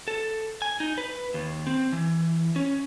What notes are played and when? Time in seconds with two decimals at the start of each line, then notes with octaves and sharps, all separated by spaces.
0.08 A4
0.62 G#5
0.80 D#4
0.98 B4
1.34 D#2
1.67 C4
1.92 E3
2.56 C#4